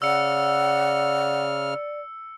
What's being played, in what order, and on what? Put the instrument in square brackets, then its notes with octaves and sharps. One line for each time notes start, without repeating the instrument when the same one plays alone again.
[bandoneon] C#3 F6 [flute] D5 [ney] F#5 [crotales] E6 C#7